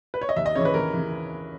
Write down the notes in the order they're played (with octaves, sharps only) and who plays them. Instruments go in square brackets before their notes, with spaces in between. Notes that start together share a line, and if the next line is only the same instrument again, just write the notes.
[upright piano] B4
C#5
D#5
D#2 E5
D#5
C#3 E3 C#5
B4
D#2 A#4
C#3 E3